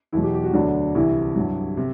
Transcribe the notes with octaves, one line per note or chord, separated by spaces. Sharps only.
E2 B2 F#3 E4
G4
G4
F#4
D2 D3 F#3 D4
C2 C3 E3 E4
G2 F#3
C3